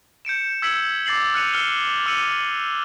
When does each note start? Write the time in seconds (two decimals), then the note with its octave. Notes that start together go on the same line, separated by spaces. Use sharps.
0.25 G6 C#7 D7 E7
0.62 E6 G#6 B6 C#7 D7 F#7
1.06 D6 A6 C7 F#7
1.34 F6 F#6 C#7 D#7 F7
1.53 E6 F6 C#7 E7 F7 G7
2.06 D6 E6 C#7 D#7 F#7 G7